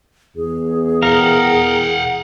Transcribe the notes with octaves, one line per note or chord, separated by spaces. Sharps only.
E2 G#4
A#4 F5 F#5